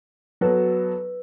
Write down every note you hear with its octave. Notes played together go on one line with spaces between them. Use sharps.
F#3 B3 F#4 A4 B4